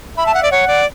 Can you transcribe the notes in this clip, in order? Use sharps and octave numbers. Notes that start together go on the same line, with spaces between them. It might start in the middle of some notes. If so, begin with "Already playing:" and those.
E5 B5
A5
F#5
D5
C#5 F#5
D5